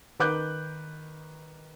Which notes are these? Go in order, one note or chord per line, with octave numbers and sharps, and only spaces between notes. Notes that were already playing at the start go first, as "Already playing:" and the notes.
D#3 B4 D6 F#6 G6